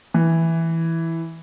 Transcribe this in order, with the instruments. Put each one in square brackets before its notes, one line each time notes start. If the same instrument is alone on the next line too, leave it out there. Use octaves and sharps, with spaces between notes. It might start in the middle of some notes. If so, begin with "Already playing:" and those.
[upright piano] E3